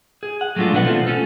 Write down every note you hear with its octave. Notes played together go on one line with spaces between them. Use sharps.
G#4
F#5
F#3 G#3 A3 D4 F4
B1 B2 E3 D4 B4 F#5
A3 B3 C4 F4 A4
C#4 F4 A4